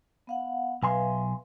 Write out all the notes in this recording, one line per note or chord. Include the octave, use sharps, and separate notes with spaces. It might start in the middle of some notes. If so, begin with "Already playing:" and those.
B3 F5 F#5
B1 B4 E5 F5 G#5 C6